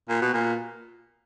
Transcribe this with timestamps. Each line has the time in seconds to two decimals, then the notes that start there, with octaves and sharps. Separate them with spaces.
0.09 A#2
0.21 B2
0.34 A#2